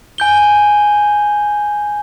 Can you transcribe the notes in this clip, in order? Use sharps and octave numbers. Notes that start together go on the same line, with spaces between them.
G#5 G6 G7